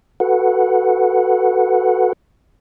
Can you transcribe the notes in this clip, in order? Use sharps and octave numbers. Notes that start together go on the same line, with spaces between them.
F#4 A4 B4 F#5